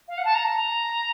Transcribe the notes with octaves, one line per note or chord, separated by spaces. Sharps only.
F5
F#5
A5
A#5